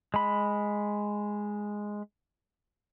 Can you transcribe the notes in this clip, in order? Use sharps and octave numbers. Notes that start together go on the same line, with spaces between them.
G#3 B5